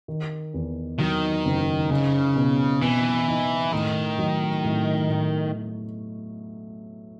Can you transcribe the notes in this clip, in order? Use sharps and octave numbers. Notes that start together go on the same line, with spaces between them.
D#3
E2
D#3 F#3
F#1
C#3 D#4
B2
B2 E3
D#4
A2 D#3
F#3
A2
A2